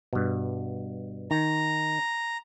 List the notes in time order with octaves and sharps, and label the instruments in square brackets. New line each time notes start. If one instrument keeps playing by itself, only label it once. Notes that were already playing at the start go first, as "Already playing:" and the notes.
[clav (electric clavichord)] G2 B2
[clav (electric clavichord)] D#3 [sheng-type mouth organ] A#5